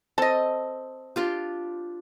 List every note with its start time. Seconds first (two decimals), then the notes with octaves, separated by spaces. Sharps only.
0.18 C4 A4 D#5
1.16 D4 F4 G4